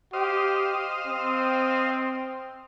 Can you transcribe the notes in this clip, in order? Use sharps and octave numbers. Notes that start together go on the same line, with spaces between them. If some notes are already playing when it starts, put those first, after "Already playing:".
G4 C5 D#5 F5
C4